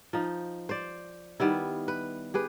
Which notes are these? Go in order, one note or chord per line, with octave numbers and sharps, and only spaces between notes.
F3 D#4
C5 D5
D#3 G3 B3 E4
B4
G4 G#4 B4